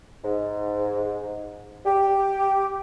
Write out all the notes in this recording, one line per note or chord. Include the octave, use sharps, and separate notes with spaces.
G#2
G4